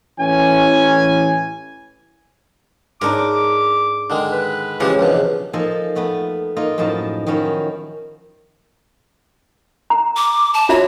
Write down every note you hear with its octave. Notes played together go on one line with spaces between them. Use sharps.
A1 E3 C#4 G#5
G#2 D4 D#4 A#4 D6
D3 D#3 G#3
B4
C#3 E3 F3 G#3 G4
A#1 E2 B2
F3 A#3 D#4 A4 G#5 C6
F2 A3 B3 F#5
A#3 D#4 F4
F#2 A2 F3 D#4 A5
D#3 F3 F#3 C#4 D#4 E4
A#5
D6
A5
F4 F#4 C#5 E5